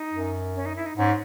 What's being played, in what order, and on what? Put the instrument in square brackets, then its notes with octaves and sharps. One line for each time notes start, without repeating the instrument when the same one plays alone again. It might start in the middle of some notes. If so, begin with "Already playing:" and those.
Already playing: [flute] D#4
[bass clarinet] F#2
[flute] C#4
D#4
E4
D#4
[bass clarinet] G#2 [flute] C#4